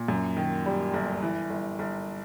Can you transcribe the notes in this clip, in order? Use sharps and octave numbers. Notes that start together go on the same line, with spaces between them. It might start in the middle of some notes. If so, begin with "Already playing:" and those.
Already playing: A#2
F#2
D#3
G3
G1
E3
G1
G1